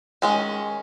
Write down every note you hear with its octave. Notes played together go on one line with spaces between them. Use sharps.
D#3 G#3 C#4